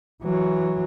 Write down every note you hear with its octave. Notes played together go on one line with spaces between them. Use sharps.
E3 F#3